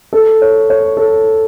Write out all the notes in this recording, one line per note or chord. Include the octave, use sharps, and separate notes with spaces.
A4
C#5
C#5
A4